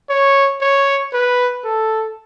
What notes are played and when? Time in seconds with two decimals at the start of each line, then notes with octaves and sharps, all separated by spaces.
0.10 C#5
0.61 C#5
1.13 B4
1.64 A4